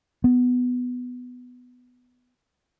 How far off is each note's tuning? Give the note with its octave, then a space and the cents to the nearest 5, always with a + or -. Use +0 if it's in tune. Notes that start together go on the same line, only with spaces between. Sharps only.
B3 +10